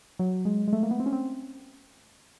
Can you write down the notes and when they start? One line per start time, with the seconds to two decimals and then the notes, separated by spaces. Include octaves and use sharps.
0.19 F#3
0.45 G#3
0.68 G#3
0.73 A3
0.83 A#3
0.91 B3
1.00 C4
1.06 C#4
1.13 C4